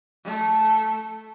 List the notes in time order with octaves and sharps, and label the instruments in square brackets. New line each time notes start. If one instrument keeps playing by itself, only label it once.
[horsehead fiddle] A3 A4